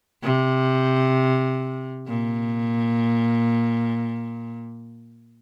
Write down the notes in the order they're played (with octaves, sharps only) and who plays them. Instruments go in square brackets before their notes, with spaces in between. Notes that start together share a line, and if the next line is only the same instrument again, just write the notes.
[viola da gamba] C3
A#2